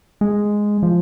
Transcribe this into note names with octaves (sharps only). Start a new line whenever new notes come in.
G#3
F3